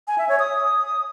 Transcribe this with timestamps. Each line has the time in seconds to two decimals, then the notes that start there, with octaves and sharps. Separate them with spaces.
0.08 G#5
0.18 E5
0.29 C#5
0.39 D#6